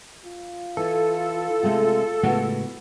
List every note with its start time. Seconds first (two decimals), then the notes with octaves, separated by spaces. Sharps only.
0.25 F4
0.77 E3 A4
1.63 C3 G#3 A3
2.23 A2 C#3 G#3 B3 F#4